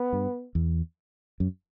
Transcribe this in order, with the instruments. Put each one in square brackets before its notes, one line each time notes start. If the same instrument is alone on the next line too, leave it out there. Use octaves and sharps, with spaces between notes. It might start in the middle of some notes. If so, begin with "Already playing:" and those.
Already playing: [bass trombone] B3
[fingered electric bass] G2
E2
F#2